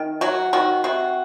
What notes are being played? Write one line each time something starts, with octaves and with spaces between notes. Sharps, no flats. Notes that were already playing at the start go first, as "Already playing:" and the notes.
Already playing: D#3
F#3 F#4
D#3 F#4
C3 F#4